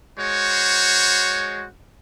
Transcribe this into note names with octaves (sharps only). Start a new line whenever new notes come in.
G#3 F#4 C5 C#5